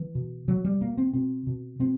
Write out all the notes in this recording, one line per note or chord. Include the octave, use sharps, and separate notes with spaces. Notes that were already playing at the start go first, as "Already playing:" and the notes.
Already playing: E3
B2
B2 F#3
G3
B2 A#3
C4
B2 C4
B2
B2 C4